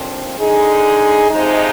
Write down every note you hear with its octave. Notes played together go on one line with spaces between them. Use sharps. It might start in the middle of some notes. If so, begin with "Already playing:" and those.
Already playing: D#2 D3 F3 C4
D3 G#3 D#4 G#4
C3 F3 G#3 D#4